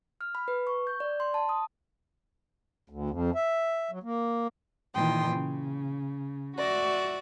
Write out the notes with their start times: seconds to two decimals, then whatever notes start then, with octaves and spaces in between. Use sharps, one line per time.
0.21 F6
0.35 B5
0.48 B4
0.67 C#6
0.87 G6
1.00 D5
1.20 C6
1.34 A5
1.49 D#6
2.90 D2
3.10 F2
3.35 E5
3.91 F#3
4.03 A#3
4.94 A#2 D#3 E3 G5 C6 D#6
5.32 C#3
6.56 F#4 D5 E5